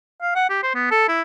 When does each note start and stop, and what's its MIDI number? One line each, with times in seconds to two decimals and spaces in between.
0.22 0.33 77
0.35 0.49 78
0.49 0.58 67
0.63 0.72 72
0.75 0.89 59
0.91 1.07 69
1.08 1.22 64